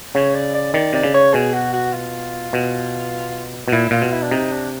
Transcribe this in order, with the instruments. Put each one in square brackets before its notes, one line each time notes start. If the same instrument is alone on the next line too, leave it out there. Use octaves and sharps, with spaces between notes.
[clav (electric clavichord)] C#3 [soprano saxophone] C#5
[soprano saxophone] D5
D5
[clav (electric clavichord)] D#3 [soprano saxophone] D5
[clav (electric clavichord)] C3 [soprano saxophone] D5
[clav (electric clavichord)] C#3
[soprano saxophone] C#5
[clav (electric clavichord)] B2 [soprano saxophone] G#4
[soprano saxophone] F#4
F#4
F4
[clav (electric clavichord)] B2
B2
[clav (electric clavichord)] A#2 [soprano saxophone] E4
[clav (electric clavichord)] A#2 [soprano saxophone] F4
[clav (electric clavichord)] B2
[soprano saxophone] E4
D4
[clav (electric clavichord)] C3 [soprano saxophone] D#4
[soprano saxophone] D4